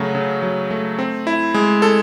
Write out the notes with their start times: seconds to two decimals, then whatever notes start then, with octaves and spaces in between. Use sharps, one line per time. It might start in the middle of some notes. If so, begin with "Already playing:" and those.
Already playing: C#3 F#3 A3
0.15 C#3
0.42 F#3
0.71 A3
0.99 C4
1.27 E4
1.54 G#3
1.82 A4